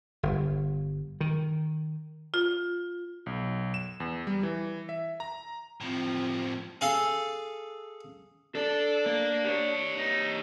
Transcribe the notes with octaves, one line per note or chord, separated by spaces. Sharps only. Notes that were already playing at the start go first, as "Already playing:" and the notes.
G1
D#3
F4
B1
E7
E2
G3
E3
E5
A#5
A2 F3 C4
G#4 A4 F5
D4 A4 D5
A#3
G4 C#5
D#4